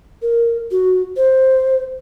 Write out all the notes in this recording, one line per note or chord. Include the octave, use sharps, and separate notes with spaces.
A#4
F#4
C5